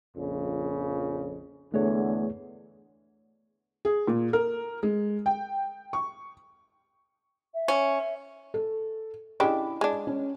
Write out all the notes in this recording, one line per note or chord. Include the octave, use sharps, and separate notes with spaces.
A#1 F2 C#3
E2 D3 A3 G#4 C#5
G#4
A#2
A#4
G#3
G5
C#6
E5
C#4
A4
C#3 D4 E4 G4 D#5 B5
G#3 D4
C#4